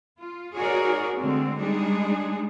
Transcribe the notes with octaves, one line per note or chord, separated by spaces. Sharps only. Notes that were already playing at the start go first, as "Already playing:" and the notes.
F4
D#4 F#4 G#4 A#4 C#5 D5
D3 G#3 A3 C4
G3 G#3 D4 D#4 G#4